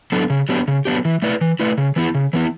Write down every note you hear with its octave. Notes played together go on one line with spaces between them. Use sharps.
F#3 B3 D4 A4
C#3
F#3 B3 D4 G4
C#3
F#3 B3 D4 G4
E3
A3 E4 B4 D5
E3
A3 E4 B4 D5
C#3
E3 B3 E4
C#3
E3 B3 E4